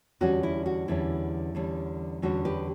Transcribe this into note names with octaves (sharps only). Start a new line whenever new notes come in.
E2 D3 G3 C#4 F#4
E4
F#4
E2 D3 G3 C#4 E4
E2 D3 G3 C#4
E2 D3 G3 C#4 F#4
G4 B4